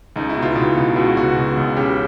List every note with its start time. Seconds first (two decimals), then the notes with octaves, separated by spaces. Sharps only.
0.16 C#2 D#4
0.29 E4
0.37 B2
0.42 F4
0.56 B2
0.77 C#2
0.96 C#2 F#4
1.17 B2 F#4
1.36 B2
1.57 C#2
1.77 C#3 G4